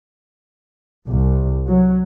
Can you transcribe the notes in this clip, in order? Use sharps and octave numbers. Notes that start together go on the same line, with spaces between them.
C2
F#3